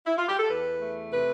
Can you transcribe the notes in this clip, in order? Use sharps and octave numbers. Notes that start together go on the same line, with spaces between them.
E4
F4
G4
A4
E2 B4
A3
C3 B4